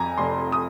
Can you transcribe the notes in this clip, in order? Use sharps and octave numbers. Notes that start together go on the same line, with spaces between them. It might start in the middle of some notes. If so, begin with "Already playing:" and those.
Already playing: F2 G#5 A#5
F1 C6
D#6